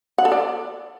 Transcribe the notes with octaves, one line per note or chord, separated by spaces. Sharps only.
F#5
A4
D5